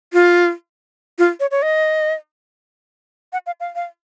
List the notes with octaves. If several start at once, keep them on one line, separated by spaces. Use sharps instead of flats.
F4
F4
C#5
C#5
D#5
F#5
F5
F5
F5